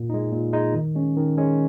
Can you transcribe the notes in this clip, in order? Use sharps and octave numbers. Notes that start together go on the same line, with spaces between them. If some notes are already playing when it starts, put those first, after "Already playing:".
Already playing: A#2
G#3 D#4
A#2
G#3 D#4
D#3
G#3 C#4
D#3
G#3 C#4